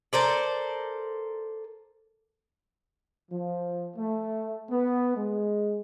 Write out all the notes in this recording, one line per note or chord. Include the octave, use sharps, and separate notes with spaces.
A4 A#4 C5 D5
F3
A3
B3
G#3